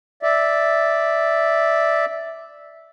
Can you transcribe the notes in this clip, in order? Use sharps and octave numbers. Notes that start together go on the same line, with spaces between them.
D5 E5